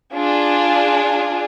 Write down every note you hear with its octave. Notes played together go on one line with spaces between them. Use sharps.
D4 F4 G#4